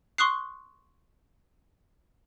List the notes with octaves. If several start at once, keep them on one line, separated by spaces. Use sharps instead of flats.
C6 C#6 D#6 F#6 C7